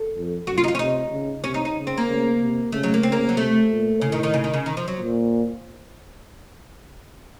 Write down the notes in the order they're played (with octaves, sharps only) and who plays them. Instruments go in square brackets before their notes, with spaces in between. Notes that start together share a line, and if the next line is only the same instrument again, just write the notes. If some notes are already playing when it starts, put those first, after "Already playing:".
Already playing: [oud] A4
[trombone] F2
[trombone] F#2 [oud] F#4
[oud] F4
D#4
F4
C#4
[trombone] C3 [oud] D#4
[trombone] C#3
[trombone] C3 [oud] C#4
[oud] D#4
D#4
[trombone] C#3
[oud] C4
A#3
[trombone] C#3
C3
[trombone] C#3 [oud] A3
[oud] F#3
A#3
[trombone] C#3 [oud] C4
[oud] A#3
F#3
[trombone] C3 [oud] A3
[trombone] A#2
[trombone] A2 [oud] C#3
[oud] D#3
D#3
C#3
D#3
C#3
D#3
F3
F#3
[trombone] A#2